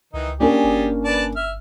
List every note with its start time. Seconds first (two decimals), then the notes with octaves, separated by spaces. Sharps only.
0.14 C#2 D#3 E3 D#4
0.40 G3 A#3 C#4 D4 G4 G#4
0.64 G1
1.05 B4 D5 A5
1.36 E5 F6